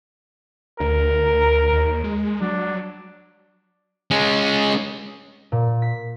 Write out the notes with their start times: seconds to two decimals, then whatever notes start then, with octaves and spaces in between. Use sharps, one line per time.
0.80 D2 A#4
1.72 D#2
2.04 G#3
2.41 F#3 D4
4.11 G#3 C#4
5.52 A#2
5.82 B6